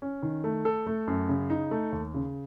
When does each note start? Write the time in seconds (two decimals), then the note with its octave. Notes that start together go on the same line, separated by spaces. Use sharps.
0.02 C#4
0.22 D#3
0.44 A3
0.65 A4
0.87 A3
1.07 F#2
1.29 C#3
1.50 D#4
1.71 A3
1.92 D#2
2.14 C#3